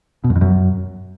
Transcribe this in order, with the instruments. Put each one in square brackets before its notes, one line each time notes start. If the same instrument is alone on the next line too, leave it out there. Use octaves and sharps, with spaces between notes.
[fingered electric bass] B2
F#2
F2
F#2